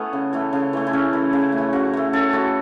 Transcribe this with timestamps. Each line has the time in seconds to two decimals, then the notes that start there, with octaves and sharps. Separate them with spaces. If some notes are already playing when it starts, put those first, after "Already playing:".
Already playing: A3 B3 C#4 E4 A4
0.13 C#3
0.33 E3 A3
0.53 C#3
0.73 E3 A3
0.87 E4
0.93 C#3 C#4
1.13 E3 A3
1.33 C#3
1.52 A3
1.58 E3
1.73 C#3 F#4
1.93 E3 A3
2.13 C#3 A4
2.33 E3 A3 F#4